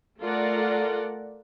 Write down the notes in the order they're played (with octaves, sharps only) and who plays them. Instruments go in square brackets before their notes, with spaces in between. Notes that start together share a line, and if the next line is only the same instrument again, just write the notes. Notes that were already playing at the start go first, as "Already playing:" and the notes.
[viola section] A3 F4 A4 A#4 D5 F#5